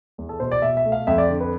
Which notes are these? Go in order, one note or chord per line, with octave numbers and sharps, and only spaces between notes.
E2
A4
B2 C5
D5
B2 E5
E5
A3
F5
F2 E5
D5
D3
B4